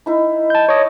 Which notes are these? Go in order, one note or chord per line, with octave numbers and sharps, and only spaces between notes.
D#4 E4
A5 G6
C#5 D#5